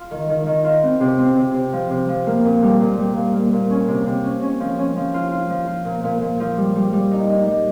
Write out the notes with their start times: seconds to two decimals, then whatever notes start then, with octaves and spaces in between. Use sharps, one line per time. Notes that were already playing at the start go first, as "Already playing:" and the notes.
Already playing: F4
0.11 D#3
0.29 D#3
0.46 D#3
0.64 F4
0.83 C4
1.00 C3
1.18 C4
1.37 C3
1.54 C3
1.73 F3
1.90 C3
2.08 F3
2.27 A#3
2.44 A#2
2.63 G3
2.80 A#2
2.98 G3
3.16 A#2
3.34 A#3
3.53 A#2
3.70 C#4
3.88 C3
4.06 C3
4.24 C#4
4.42 C#4
4.60 F3
4.78 C#4
4.96 F3
5.14 F4
5.32 F4
5.49 F3
5.67 F4
5.85 A#2
6.04 A#2
6.21 A#2
6.40 F3
6.57 G3
6.75 G3
6.93 G3
7.11 D#4
7.29 D#4
7.47 G3